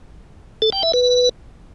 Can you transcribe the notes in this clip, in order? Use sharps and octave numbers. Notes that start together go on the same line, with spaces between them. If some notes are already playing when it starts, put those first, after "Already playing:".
A4
G5
E5
B4